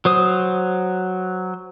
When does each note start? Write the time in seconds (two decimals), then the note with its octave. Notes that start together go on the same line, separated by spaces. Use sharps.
0.05 F#3 C5 D#6